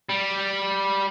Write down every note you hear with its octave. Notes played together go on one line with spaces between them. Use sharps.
G3